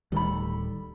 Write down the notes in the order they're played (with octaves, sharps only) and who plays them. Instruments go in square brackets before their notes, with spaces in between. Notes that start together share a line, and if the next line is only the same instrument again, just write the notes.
[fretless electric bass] D1 D#3 G3 [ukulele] A4 B5